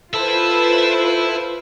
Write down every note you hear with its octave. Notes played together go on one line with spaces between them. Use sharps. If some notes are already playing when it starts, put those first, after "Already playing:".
F4 A4 B4 C5 E5 B5